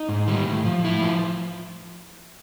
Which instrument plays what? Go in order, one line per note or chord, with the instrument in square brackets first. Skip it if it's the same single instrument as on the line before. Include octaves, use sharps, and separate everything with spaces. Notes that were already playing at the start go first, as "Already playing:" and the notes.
Already playing: [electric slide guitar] D#4
G#2
D#3 G3
A2
F3
A2 E4
F3